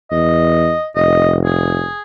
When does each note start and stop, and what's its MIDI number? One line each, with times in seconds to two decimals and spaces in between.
0.11 0.73 40
0.11 0.86 75
0.95 1.86 29
0.95 1.35 75
1.45 2.01 68